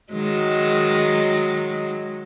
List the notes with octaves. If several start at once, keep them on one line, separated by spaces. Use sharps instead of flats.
D#3 F#3 G#3